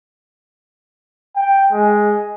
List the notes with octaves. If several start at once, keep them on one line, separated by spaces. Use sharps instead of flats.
G5
G#3